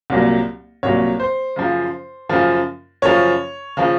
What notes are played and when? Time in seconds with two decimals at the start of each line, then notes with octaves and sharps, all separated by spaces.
0.10 C2 A#2 F#3
0.83 C2 A#2 F#3 C#5
1.20 C5
1.56 F#2 C#3 F3
2.29 F#2 C#3 F3
3.02 F#2 C#3 F3 C#5
3.77 C#3 F3